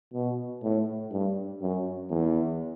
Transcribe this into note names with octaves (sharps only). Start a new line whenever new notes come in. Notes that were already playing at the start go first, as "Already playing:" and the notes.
B2
A2
G2
F#2
E2